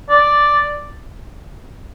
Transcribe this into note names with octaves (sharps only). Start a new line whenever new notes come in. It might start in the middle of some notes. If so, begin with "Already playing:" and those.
D5